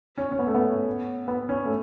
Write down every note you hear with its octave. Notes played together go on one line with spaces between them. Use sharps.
C#4
C#4
B3
A3
B3
B3
C#4
A3